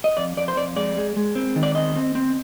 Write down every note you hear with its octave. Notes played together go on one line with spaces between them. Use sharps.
D#5
F2 D5
F2 D5
C5
F2 D5
G#3 D5
G#3
G#3
C4
D#3
D5
C4 D#5
C4
C4